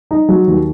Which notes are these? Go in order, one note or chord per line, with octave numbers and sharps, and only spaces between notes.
D#4
F#3
D#2